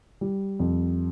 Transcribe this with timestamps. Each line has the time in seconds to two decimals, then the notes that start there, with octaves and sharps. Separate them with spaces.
0.21 G3
0.60 F2